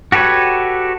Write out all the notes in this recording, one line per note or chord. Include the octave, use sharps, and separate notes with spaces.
F#4 G4 A4 B4 C#5